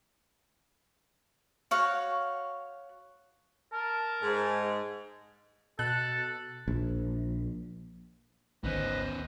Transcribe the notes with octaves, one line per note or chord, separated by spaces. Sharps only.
F#4 C#5 F5
A#4 A5
G#2 G#4
B2 A4 F#6
A#1
G#1 D2 D#3 B3 C#4 B4 C5 D#5